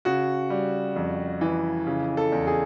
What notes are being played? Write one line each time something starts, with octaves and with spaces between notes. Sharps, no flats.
C#3 F#4
G3
F2
E3
C#3
A4
E2
G#4